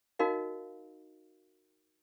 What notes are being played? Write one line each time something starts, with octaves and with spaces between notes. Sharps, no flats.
D#4 F#4 A#4 D#5 F5